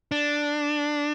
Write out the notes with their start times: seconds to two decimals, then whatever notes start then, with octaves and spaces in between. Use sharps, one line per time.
0.12 D4